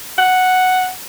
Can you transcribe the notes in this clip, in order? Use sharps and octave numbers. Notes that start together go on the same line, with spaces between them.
F#5